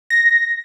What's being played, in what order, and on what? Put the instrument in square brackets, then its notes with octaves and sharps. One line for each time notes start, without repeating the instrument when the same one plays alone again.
[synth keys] A#6